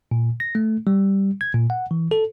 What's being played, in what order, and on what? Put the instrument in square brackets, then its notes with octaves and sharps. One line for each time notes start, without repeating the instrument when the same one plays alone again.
[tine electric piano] A#2
A#6
A3
G3
G#6
A#2
F#5
E3
A4